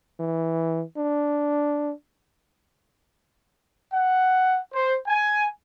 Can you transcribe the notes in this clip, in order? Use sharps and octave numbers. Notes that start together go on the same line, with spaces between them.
E3
D4
F#5
C5
G#5